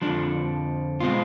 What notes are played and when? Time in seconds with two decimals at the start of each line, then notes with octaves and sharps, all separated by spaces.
0.02 F2 D3 F3 D4
1.00 B2 G#3 C4 F4